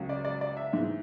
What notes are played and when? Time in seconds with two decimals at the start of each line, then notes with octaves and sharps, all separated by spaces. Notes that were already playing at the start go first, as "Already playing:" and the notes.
Already playing: C#2 C#3 F#3
0.09 D5
0.25 D5
0.41 D5
0.57 E5
0.73 G#2 E3